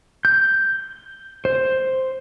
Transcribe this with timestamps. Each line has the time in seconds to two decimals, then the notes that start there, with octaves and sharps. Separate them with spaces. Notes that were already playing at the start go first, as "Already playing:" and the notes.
0.25 G6
1.45 C5